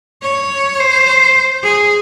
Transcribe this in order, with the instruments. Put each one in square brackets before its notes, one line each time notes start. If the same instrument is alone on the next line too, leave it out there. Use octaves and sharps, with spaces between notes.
[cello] C#5
C5
G#4